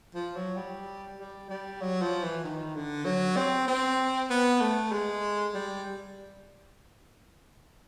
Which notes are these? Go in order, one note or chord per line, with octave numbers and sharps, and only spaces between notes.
F3
F#3
G3
G3
G3
F#3
F3
E3
D#3
D3
F#3
C4
C4
B3
A3
G#3
G3